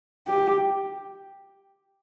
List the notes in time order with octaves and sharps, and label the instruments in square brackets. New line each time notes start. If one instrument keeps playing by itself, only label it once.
[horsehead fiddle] G4